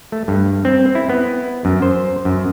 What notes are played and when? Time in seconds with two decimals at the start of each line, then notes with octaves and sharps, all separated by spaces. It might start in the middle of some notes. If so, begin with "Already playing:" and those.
0.12 A3
0.28 G2
0.65 C4
0.95 E4
1.09 B3
1.65 F#2
1.82 C5
2.25 F#2